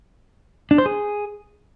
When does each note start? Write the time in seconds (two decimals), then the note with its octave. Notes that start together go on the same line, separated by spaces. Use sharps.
0.71 D4
0.78 C5
0.86 G#4